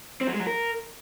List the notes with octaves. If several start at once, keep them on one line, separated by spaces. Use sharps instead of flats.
C4
F#3
G#3
F#3
A#4